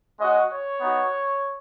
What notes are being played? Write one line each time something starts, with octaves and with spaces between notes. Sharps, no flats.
G#3 C#4 F#4 D#5
C#5
B3 D#4 F#4